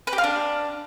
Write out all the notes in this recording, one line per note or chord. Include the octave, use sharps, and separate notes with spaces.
B4
G4
F5
D4